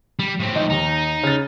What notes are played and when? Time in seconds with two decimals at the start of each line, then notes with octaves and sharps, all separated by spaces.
0.19 G3
0.40 A2 C4
0.52 F3 D#4
0.70 D#2 D#4
1.23 C#3 A6